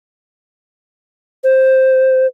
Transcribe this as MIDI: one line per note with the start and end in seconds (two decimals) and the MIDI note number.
1.44 2.27 72